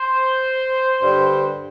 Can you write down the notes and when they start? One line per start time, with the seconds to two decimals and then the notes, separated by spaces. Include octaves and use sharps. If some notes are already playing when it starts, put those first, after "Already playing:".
Already playing: C5
1.00 G2 D3 G3